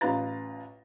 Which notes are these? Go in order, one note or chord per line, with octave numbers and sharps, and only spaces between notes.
A1 F4 B4 A#5 A6